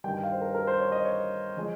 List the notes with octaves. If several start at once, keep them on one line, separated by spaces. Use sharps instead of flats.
G2 D#3 G3 G5
G5
F5
C5
A#4
A#4
C5
C#5
D#5
C#5
F3 G#3